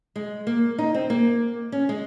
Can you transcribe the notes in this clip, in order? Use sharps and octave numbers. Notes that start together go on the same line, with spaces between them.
G#3
A#3
D#4
C4
A#3
C#4
G#3